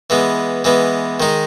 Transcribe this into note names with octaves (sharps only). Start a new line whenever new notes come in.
E3 G#3 B3
E3 G#3 B3
D#3 G#3 D#4